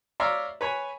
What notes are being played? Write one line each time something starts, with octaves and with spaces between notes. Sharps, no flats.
C#5 D5 E5 F5 A#5 C6
B4 C#5 G#5